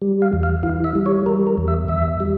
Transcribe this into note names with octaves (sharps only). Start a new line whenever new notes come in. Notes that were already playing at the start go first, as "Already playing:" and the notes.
G3
F5
E2
F5
E3 F5
E5
G3
C#5
G3 A#4
A#4
E2
E5
E2 E5
G3